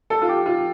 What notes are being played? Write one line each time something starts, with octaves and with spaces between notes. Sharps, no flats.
A4
F4
G4
F4